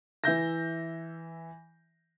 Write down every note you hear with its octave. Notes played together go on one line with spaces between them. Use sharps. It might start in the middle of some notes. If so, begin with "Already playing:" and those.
E3 E5 G6 A#6